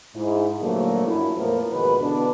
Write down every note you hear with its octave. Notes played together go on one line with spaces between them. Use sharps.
G#2 E4
A#2 D3 F3 F#3 A3 A#3
F#2 E4
E2 A2 F3 A#3 A#4
D#2 G#2 B2 B4
B2 D3 E3 B3 D4